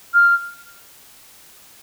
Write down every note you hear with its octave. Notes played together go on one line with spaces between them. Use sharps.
F6